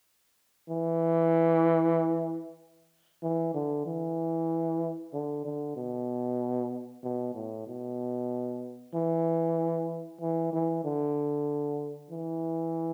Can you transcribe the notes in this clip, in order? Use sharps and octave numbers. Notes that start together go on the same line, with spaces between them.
E3
E3
D3
E3
D3
D3
B2
B2
A2
B2
E3
E3
E3
D3
E3